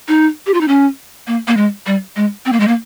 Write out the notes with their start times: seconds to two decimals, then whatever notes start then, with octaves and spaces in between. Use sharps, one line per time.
0.08 D#4
0.46 G4
0.54 F4
0.61 D#4
0.68 C#4
1.27 A#3
1.47 A#3
1.57 G#3
1.86 G3
2.16 G#3
2.46 C4
2.52 A#3
2.60 G#3
2.67 A#3